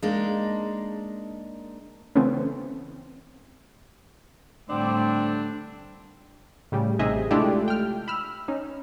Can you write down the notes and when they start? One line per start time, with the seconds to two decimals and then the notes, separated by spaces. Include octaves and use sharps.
0.02 G#3 A#3 D4 D#4
2.15 C#3 E3 A3 B3 C4
4.70 A2 D3 G3 C4 D4
6.72 A2 C#3 G3
6.99 A1 C3 D#4 G#4 D#5 E5
7.31 G#3 A3 D4 E4 F4 G4
7.68 G5 F6
8.08 B5 E6 F6
8.48 C#4 D#4